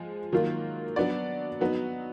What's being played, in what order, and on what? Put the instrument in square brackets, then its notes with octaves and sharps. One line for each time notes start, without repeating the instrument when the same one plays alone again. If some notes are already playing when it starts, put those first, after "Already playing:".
Already playing: [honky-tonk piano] F3 G#3
D#3 F#3 A#3 F4
F#3 B3 D4 F#4 D5
F#3 B3 D#4 F#4